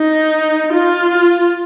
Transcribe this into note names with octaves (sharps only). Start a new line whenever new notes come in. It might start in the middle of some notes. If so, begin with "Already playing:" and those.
Already playing: D#4
F4